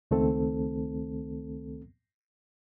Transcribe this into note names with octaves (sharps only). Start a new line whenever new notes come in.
C#2 D#3 A3 C4 A4